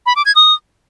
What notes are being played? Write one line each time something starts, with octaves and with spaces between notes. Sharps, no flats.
B5
D6
G#6
D#6